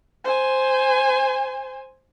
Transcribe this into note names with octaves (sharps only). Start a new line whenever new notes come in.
C5 G#5